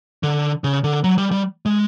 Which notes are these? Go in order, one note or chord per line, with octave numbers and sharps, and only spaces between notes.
D3
C#3
D3
F#3
G3
G3
G#3